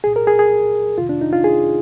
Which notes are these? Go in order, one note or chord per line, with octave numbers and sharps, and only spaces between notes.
C2 A#2 G#4
A#4
G#4
G#4
F2 C3 D#3 F4
D4
D#4
F4
G#4